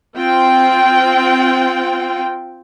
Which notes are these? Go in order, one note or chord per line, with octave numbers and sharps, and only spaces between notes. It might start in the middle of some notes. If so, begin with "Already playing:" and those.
C4 F4 G5